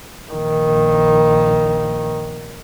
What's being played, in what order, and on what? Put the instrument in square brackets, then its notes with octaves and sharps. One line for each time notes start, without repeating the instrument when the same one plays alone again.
[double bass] A#1 D#3